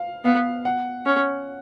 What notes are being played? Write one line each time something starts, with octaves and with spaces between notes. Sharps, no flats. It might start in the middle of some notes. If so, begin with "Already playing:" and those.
Already playing: F5
B3 F5
F#5
C#4